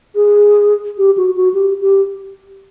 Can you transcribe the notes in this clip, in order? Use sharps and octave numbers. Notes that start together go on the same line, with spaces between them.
G#4
G4
F#4
F#4
G4
G4